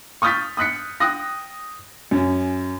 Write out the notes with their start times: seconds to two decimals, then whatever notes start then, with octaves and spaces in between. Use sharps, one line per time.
0.22 C#6 D#6 F6 G6 A6 B6
0.57 D#6 F#6 B6 C#7
1.00 G5 D#6 F#6 A#6
2.11 F#2 C#4